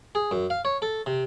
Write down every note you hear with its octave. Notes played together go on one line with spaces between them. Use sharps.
G#4
F#2
F5
C#5
A4
C3